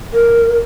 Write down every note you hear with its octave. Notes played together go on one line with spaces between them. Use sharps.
A#4